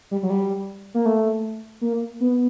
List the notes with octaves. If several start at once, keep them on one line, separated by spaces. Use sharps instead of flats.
G3
F#3
G3
A#3
A3
A#3
B3